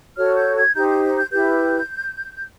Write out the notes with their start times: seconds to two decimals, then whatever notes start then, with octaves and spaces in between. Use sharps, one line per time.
0.16 F#4 A4 C#5 F6
0.36 G6
0.55 G#6
0.74 D#4 G4 C5 G6
0.88 G6
1.04 G6
1.17 G6
1.32 E4 G4 B4 G6